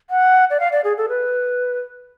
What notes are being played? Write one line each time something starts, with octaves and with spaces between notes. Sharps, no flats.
F#5
D5
F5
D5
G#4
A4
B4